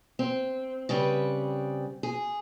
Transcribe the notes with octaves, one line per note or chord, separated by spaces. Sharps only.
C4
C#3 G3 C4 B4
G#4